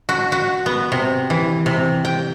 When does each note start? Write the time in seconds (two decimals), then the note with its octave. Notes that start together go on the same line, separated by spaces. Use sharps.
0.09 F#4
0.32 F#4
0.66 B3
0.92 C3
1.30 E3
1.66 C3
2.05 G5